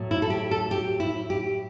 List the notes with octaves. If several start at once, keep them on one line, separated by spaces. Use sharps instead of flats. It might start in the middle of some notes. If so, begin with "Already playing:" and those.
Already playing: A2 F#3
E4
A4
G4
A4
G4
E4
G4